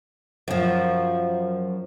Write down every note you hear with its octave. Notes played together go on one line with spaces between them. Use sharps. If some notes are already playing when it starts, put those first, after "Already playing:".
F#2 F3